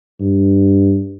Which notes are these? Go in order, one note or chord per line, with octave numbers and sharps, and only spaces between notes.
G2